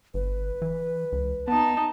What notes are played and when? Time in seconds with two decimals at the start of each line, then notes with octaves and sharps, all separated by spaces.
0.14 G1 B4
0.62 E3
1.12 C#2
1.48 B3 D#4 A5